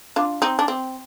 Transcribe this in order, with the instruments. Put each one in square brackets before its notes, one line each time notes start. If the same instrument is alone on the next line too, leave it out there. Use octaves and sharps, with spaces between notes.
[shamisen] D4 F4
C4 D#4
D4
C4